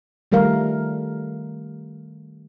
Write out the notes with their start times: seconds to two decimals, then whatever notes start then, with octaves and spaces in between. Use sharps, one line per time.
0.32 D#3 G3 A3 A#4 F5